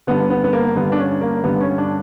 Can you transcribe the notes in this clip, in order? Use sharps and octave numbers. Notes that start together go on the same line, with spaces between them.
G2 D3 B3
B3
B3
A#3
G2 D3 B3
D4
C#4
A#3
G2 D3 B3
C#4
D4